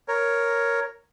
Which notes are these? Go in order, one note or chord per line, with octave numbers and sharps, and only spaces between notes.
A#4 C#5